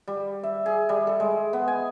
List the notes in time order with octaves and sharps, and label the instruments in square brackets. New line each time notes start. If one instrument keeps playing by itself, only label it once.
[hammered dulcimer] G3
E5
G#4
G3
A4
G#3
B3
G#5